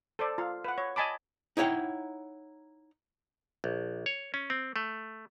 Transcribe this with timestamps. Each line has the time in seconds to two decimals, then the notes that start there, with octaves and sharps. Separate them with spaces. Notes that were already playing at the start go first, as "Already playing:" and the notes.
0.19 A4 C5 D5
0.38 F4 F5
0.65 B4 F#5
0.78 C#5
0.96 D#5 G#5 A5 B5 D6
1.57 D#4 E4 C#5 F#5 G5
3.64 A#1
4.06 C#5
4.34 C#4
4.50 C4
4.76 A3